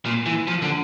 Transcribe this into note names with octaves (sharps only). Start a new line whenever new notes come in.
A#2
E3
F3
D3